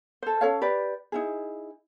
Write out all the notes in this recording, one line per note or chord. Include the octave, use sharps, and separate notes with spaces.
A4 C5
C#4 A4 C#5 F5
G4 B4 D5
D#4 E4 G#4